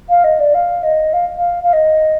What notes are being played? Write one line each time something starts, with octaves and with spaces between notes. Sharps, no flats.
F5
D#5
D5
F5
D#5
F5
F5
F5
D#5